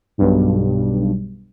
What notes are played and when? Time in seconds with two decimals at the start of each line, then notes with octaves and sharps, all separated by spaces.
0.18 B1 G2